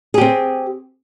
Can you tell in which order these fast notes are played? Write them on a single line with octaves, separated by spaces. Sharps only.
G#4 G4 C4